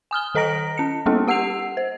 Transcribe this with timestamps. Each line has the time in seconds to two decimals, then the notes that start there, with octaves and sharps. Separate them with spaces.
0.11 G#5 D#6 F6 G7
0.35 D#3 A4 D#5 A#5 A#6 D7
0.77 C#4 C#7
1.06 G3 A#3 B3 C#4 E4 A4
1.27 G4 F#5 E6 C7 F7
1.77 C5